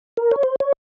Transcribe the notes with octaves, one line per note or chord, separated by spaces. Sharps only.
A#4
C#5
C5
C#5